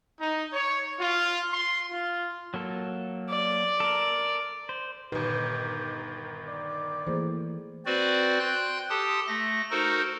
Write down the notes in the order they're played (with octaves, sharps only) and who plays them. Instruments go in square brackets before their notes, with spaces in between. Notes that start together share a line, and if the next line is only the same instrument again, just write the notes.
[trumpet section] D#4
C#5
F4
C6
F4
[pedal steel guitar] F#3 A#3 A4
[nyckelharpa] D5
[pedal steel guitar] A4 A#4
C5
[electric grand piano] G1 D#3 [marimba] A#2 [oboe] G4 [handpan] B4
[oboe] D5
[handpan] E3 A3 [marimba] A#3 G#4 C5
[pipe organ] C4 F#4 B4 C5 D5
G5 C6 F#6 G6
G4 A4 A5 C6 D#6
A3 A#6
D#4 F#4 A4 A#4 C5